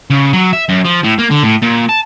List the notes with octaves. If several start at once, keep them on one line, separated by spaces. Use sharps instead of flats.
C#3
F#3
E5
F#2
F3
A2
A#3
D3
A2
A#2
A5